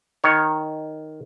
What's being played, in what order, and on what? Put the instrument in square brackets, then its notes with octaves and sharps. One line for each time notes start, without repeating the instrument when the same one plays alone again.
[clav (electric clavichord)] D#3 C#5